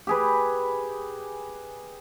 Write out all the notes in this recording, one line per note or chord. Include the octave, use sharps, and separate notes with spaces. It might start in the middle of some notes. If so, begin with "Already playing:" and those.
G4 G#4 B4